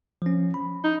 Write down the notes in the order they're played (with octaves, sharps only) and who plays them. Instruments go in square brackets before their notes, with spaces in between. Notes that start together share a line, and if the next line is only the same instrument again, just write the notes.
[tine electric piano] F3 C#4
B5
[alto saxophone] D#4